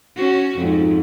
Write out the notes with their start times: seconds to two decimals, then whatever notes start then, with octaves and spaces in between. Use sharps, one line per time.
0.16 C#4 F#4
0.57 F2 G#2